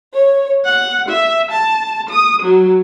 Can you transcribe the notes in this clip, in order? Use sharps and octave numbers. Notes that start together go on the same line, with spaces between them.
C#5
F#5
E5
A5
D#6
F#3